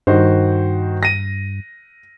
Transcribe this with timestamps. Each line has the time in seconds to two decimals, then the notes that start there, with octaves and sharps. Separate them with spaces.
0.07 G2 D#3 F#4 C5
1.03 A#6 D#7